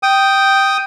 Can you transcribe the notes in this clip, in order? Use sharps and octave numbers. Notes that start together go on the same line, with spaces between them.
G5 D#6